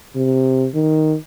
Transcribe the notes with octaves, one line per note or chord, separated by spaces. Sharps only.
C3
D#3